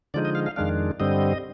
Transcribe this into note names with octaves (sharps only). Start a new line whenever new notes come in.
D3 F3 G#3 D#4 D5
D#5
F5
F5
F2 D#3 G#3 D4 F5
G2 D3 G3 C4 D#5